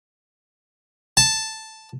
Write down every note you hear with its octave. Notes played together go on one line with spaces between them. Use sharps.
A5